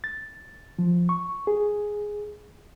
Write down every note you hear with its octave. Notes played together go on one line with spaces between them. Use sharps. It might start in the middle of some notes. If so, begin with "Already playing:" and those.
A6
F3
C#6
G#4